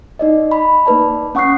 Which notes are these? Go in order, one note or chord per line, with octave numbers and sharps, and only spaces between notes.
D#4 D5 D#5
B5
A#3 D#4 B4 D5 A5
C#4 F#5 C#6 D#6 F#6 C7